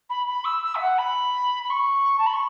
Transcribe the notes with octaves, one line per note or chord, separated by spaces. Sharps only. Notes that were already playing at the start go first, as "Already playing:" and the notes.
B5
B5
E6
E6
E5
F#5
B5
B5
C#6
A5
B5
C#6